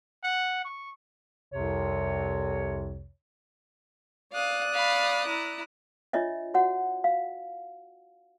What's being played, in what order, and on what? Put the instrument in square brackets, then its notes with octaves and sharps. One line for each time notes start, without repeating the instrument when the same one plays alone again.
[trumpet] F#5
C#6
[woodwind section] C2 F2 C3 C#5
[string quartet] D5 D#6 F#6 [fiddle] F5
[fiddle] F5 B5
E4 A#5
[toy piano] D4 F4 C#5 D#5 E5
F#4 C#5 F#5
F5